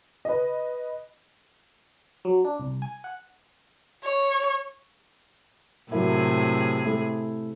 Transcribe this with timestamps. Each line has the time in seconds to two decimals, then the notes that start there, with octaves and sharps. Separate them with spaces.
0.25 B4 D#5
2.25 F#3
2.45 D4
2.60 C2
2.82 G#5
3.04 F#5
4.04 C#5
5.92 A2 C3 F#3 A#3 E4 G#4
6.85 A3 E4